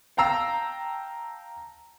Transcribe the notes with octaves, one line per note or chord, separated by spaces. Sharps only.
F5 G5 A5 A#5 E6 C7